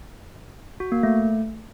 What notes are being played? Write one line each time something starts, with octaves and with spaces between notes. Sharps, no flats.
F#4
A#3
A3